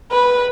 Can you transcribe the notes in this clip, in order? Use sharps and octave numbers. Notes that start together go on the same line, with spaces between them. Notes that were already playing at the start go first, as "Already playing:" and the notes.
B4